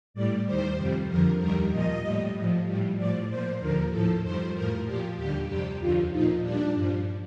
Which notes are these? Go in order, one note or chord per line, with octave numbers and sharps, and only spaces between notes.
A2 G3 D5
D#2 D#3 G3 C5
F2 C3 G3
F2 D3 F3 A#4
D#2 D#3 G3 A#4
A#2 F3 D#5
A2 G3
A2 F3
A2 G3
A2 F3 D5
A#2 F3 C5
D#2 D3 F3 A#4
A2 F3 A4
F2 D#3 G3 C5
A2 F3 A#4
A#2 F3 G4
D#2 D3 G3 G4
F2 C3 G3 G4
D#2 D3 F3 F4
A#2 F3 D#4
A#2 G3 D4
G2 F3